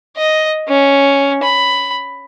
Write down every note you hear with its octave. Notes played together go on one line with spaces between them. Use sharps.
D#5
C#4
B5